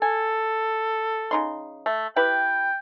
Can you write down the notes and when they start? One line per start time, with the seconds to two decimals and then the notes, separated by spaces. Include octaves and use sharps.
0.02 A4 G#5
1.31 C#3 D#4 C6
1.86 A3
2.16 E4 G4 B4 G5